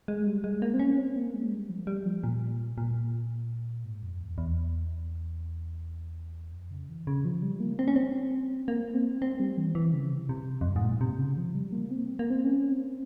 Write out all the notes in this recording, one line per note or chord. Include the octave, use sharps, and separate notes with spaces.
G#3
G3
G#3
A#3
C4
C#4
C4
A#3
G#3
G3
F3
G3
F3
A#2
A#2
G#2
F2
E2
E2
F2
C#3
E3
C#3
F3
G3
A#3
C4
C#4
C4
A#3
C4
C4
G3
E3
E3
C#3
C3
C3
F2
G2
G#2
A#2
C3
C#3
F3
G3
A#3
C4
A#3
C4
C#4
C4